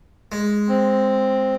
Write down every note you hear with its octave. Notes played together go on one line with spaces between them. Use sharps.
G#3
C4